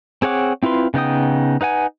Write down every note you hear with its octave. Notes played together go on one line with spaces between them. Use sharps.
C4 G#4 C#5 F#5 D6
C4 E4 F4 B4 C6
C#3 B3 D#4 G5 D#6
D#4 B4 F#5 G#5